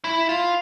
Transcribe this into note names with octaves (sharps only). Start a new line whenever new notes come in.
E4
F4